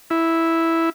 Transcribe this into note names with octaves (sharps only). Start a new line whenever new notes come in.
E4